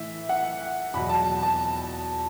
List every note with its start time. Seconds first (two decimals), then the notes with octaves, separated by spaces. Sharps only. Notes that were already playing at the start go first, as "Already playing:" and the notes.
Already playing: A2 E3 E5
0.29 F#5
0.94 E2 B2 F#3 B5
1.09 A5
1.43 A5